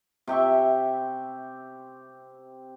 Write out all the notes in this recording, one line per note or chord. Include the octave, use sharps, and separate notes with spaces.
C3 G4 E5 C#6